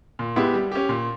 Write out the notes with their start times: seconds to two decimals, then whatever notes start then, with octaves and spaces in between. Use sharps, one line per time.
0.19 A#2
0.36 G#3 B3 E4 G4
0.54 G3
0.72 C#4 G4
0.89 A#2